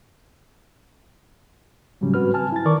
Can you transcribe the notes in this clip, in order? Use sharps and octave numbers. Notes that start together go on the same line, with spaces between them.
A2 C#3 F#3 G3 C#4
G#2 C4 F#4 B4 F6
G#5 A5 F6
E4 A6
D#3 E3 A#4 D5 C#6 D6